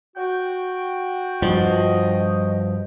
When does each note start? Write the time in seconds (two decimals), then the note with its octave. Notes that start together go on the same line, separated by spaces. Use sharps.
0.16 F#4 G5
1.42 G2 F3 D#5